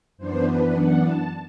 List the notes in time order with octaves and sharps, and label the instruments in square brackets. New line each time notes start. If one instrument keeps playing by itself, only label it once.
[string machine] F#2 E3 B3 D4 C5
B4
F#5
A5